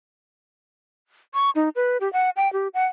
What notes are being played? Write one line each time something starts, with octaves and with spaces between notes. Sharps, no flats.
C#6
D#4
B4
G4
F#5
G5
G4
F#5